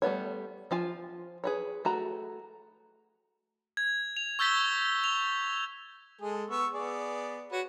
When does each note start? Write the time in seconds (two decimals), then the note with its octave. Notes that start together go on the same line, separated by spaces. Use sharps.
0.02 G3 A3 B3 C#5
0.71 F3 F4 G#5
1.44 G#4 B4 C#5
1.85 A3 F#4 A#5 B5
3.77 G#6
4.17 F7
4.39 C#6 E6 G6 A6 B6 G7
5.04 F7
6.21 G#3 G#4 A4
6.50 B3 C#6 E6
6.74 B3 G#4 D5
7.52 F#4 B4 C#5